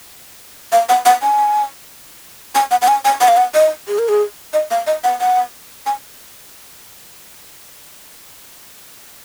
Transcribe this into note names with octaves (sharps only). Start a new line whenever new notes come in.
F5
F#5
F#5
G#5
G#5
F#5
F#5
G#5
G#5
F#5
F5
F#5
D#5
G#4
A#4
G#4
D#5
F5
D#5
F#5
F#5
G#5